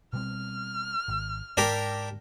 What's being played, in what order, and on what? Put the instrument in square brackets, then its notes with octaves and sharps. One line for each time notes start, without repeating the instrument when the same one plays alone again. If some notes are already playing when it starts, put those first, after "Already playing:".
[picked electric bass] B2 G3 C4 [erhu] F6
[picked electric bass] G#1
[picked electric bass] G#2 [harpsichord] D4 G4 A#4